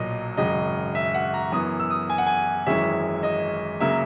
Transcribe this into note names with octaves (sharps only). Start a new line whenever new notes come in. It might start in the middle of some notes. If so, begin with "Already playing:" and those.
Already playing: B1 A#2 F#3 D#5
G#1 F#2 C#3 D#5
E5
F#5
A#5
F#2 E3 B3 D#6
E6
D#6
G#5
F#5
G#5
G#1 F#2 E3 G#3 C#4 E5
D#5
C#3 F#3 A#3 E5